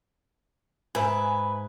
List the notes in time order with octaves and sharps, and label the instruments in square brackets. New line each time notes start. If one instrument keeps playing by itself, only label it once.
[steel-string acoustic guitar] G#2 [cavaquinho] B4 E5 [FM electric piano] G#5